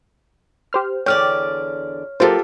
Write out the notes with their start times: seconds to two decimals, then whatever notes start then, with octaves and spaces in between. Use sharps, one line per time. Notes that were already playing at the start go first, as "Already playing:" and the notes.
0.73 G4 C5 F6
1.06 E2 D3 C#5 D5 G5 F6
2.20 F#3 A#3 F4 G4 A4 C5